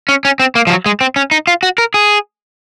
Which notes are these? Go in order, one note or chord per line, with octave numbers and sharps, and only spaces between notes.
C#4
C#4
C4
A#3
F3
F#3
G#3
C4
C#4
D#4
F4
F#4
A#4
G#4